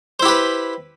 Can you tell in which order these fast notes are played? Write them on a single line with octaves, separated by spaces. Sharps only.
C5 E4 G4 B4